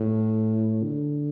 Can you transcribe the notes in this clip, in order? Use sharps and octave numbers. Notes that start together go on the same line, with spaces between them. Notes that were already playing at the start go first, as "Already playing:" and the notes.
Already playing: A2
D3